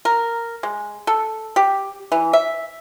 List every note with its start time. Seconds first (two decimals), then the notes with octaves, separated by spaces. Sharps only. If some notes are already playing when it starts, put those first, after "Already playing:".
0.05 A#4
0.63 G#3
1.07 A4
1.56 G4
2.12 E3
2.33 E5